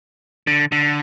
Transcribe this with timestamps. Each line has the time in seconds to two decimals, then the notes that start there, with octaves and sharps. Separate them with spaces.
0.47 D3
0.72 D3